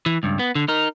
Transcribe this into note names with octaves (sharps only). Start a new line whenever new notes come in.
E3
C#2 G2
B3
D3
D#4 A#4